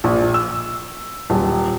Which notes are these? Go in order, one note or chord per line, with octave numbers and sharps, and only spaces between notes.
A#1
E6
D#1